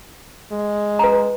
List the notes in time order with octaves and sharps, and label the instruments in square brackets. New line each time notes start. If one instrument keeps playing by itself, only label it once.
[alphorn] G#3
[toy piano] B4 A#5